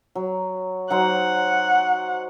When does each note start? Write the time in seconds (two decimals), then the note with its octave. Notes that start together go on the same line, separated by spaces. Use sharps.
0.15 F#3
0.90 F#3 D#4 C5 F#5